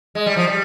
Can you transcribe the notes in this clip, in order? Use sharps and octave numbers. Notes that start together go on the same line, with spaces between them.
G#3
G3
F3
G3